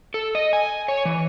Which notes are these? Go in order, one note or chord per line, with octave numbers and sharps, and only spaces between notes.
A4
D#5
G#5
C#5
E3